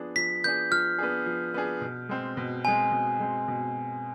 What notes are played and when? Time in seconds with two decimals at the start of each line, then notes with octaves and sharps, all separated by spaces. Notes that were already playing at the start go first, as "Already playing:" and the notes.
Already playing: F3 B3 D4 G#4
0.16 F3 B6
0.44 B3 D4 G#4 G6
0.71 F3 F6
0.98 B3 D4 G#4
1.26 F3
1.54 B3 D4 G#4
1.81 B2
2.09 G#3 C4
2.37 B2
2.65 G#3 C4 G#5
2.92 B2
3.20 G#3 C4
3.48 B2